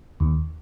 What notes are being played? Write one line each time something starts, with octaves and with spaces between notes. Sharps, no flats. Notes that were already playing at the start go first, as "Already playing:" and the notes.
D#2